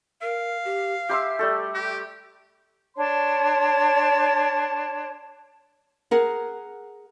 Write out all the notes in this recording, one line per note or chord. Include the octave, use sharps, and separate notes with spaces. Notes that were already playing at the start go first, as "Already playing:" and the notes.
A#4 F5
G4
G4 E5 C6 E6
G3 A3 A4
G4
D4 C#5 A5 C6
G#4 A#4 F#5